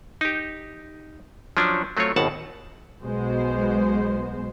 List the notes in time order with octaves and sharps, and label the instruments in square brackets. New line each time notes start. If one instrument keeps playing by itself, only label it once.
[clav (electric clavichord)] D#4 G4
F3 F#3 C#4 D4
F#3 A3 C4 F4 C#5
G#1 D#2 B2 F#5 A5
[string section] B1 B2 G#3 C5